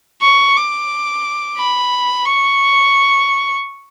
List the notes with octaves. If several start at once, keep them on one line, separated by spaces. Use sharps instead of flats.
C#6
D6
B5
C#6